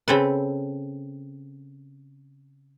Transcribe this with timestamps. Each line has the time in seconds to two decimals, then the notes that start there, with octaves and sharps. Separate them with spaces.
0.08 C#3 C4 A4 B4